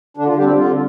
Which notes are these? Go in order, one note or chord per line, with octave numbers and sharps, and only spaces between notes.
D3 D4
F4
G3 C4 D4 G4
D3 F4